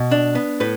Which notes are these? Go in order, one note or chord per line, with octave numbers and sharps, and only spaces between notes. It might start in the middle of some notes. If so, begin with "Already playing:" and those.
Already playing: B2
D4
B3
A2 B4